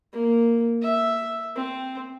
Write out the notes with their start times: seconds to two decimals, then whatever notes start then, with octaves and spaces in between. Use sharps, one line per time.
0.13 A#3
0.82 E5
1.55 C4